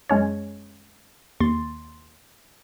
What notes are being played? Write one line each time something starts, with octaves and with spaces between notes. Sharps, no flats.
F#2 G#3 C#4 C#5
D#2 C6 A6